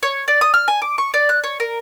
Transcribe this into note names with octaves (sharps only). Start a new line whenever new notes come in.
C#5
D5
D#6
F6
G#5
D6
C#6
D5
F#6
C#5
A#4